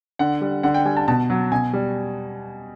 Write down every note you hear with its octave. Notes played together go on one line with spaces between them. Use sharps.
D3 F#5
G3
D3 F#5
G5
G3 G#5
A5
B2 A5
F#3
B2 G#5
G3